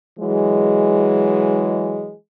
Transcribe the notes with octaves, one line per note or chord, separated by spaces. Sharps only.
E3 F#3 G#3